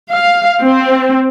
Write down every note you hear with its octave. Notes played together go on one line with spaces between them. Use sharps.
F5
C4